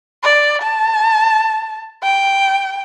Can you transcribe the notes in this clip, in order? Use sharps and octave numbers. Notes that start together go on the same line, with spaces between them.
D5
A5
G5